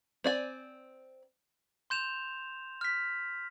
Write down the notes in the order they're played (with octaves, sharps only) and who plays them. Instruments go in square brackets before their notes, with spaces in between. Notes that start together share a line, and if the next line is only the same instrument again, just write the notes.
[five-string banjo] C4 D5 G#5
[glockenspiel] C6 G6 E7 F7
F6 B6